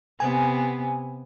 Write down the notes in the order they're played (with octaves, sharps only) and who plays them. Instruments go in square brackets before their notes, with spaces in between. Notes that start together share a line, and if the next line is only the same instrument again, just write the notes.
[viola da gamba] C3 B3 [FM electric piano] G#5